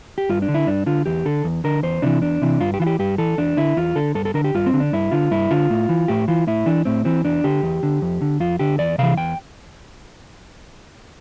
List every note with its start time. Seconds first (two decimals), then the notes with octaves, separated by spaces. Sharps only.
0.18 G4
0.29 G2 F4
0.42 D4
0.48 D3
0.54 E4
0.67 G2 D4
0.86 D3 F4
1.06 E2 G4
1.25 D3 A4
1.44 E2
1.64 D3 A#4
1.83 E2 C5
2.02 C3 E3 D4
2.22 E2 D4
2.42 C3 E3
2.60 G2 F4
2.74 G4
2.80 E3 F4
2.86 G4
2.99 G2 G4
3.18 E3 A4
3.38 E2 D4
3.57 D3 E4
3.77 E2 F4
3.96 D3 A4
4.15 G2 A4
4.25 A4
4.34 D3 A#4
4.44 G4
4.54 G2 F4
4.66 C4
4.73 D3
4.80 D4
4.93 G2 E4
5.11 D3 F4
5.31 G2 E4
5.51 D3 F4
5.70 A2
5.89 E3
6.08 A2 G4
6.28 E3 F4
6.47 A2 E4
6.66 E3 D4
6.85 A2 C4
7.05 E3 C4
7.24 E2 D4
7.44 D3 G4
7.63 E2
7.83 D3
8.02 F2
8.22 D3
8.40 F2 F4
8.59 D3 G4
8.79 E2 D5
8.98 C3 E3 F5
9.17 E2 G5